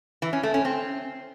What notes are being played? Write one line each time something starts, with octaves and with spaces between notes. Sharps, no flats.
E3
C#4
A3
C#4
C4